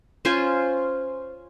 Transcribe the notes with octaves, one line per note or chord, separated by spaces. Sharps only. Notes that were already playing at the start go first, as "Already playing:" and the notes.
C#4 F4 C5 G#5